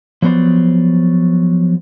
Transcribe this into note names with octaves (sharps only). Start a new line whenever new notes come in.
F3 F#3 B3 C5 D5